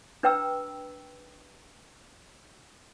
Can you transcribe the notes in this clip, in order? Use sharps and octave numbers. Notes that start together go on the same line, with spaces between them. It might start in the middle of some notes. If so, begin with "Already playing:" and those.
D4 B4 G5 A#5 E6